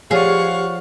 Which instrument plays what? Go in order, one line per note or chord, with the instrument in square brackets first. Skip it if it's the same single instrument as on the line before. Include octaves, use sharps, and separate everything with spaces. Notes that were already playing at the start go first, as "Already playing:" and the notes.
[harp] F3 C#5 D5 [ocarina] G4 [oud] G#4 [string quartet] F5 F#5 C#6